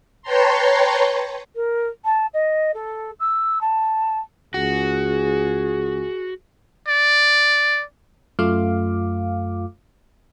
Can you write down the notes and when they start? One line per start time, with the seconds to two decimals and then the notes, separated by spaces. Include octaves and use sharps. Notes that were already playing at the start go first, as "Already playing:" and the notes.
0.22 B4 C#5 G5 A5 A#5 C6
1.55 A#4
2.05 A5
2.34 D#5
2.74 A4
3.20 E6
3.61 A5
4.54 C#2 F#4 G#4
6.88 D5
8.39 F#2 A3 F4 F5 D6